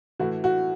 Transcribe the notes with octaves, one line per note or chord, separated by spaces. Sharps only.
A2 E3 F#4
F#4